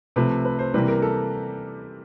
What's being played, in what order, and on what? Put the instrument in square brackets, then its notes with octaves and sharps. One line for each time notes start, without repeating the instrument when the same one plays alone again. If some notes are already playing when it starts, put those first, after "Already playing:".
[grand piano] C3 F3 A3 B4
B4
C5
C3 E3 G3 A#3 B4
A#4
A4